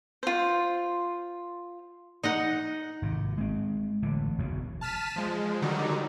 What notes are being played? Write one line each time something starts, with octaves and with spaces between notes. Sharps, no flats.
F4 C5
D#4 D#5 F#5
G#1 C3
G#3 C4
A1 D3
F#1 B1 F#2 C#3
A5 F6 B6 D#7 E7
F3 G#3
D3 D#3 F#3 G3 D#4